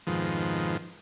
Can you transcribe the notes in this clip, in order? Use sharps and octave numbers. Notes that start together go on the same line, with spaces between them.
F2 G#2 B2 D#3 F3